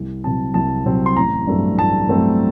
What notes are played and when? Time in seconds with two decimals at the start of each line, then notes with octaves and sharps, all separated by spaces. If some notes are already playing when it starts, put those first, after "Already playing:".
Already playing: C2
0.23 C3 F#3 C4 A5
0.54 C2 A5
0.85 C3 F#3 C4
1.06 C6
1.16 A1 A#5
1.47 G2 F#3 A3 C4
1.77 A1 A5
2.09 G2 F#3 A3 C4